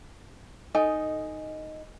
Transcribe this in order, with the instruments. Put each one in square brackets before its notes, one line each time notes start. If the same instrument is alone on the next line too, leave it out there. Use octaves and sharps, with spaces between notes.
[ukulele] D#4 [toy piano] A4 D#5 G#5